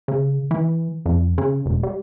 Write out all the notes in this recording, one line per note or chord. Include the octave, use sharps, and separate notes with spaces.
C#3
E3
F2
C#3
E1
G3